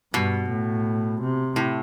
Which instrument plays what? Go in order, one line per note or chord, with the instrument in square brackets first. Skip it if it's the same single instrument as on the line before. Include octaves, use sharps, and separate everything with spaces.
[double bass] G2 [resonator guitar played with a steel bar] B2
[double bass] A2
C3
[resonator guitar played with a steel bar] A2